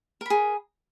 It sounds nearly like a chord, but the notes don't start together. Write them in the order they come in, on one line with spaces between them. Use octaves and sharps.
A#4 B5 G#4